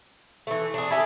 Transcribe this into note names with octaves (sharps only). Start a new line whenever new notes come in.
E3 A3
D4 G#4
G4 A4 E5 G#5 B5